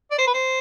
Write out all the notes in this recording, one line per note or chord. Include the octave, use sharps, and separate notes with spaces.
D5
C5
B4
C5